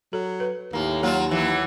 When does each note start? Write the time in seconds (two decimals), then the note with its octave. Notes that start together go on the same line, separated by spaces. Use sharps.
0.13 F#3 A4
0.40 B4
0.73 D#2 A2 A#3
1.03 F#3 A#3 F4 C#5
1.31 E3 F#3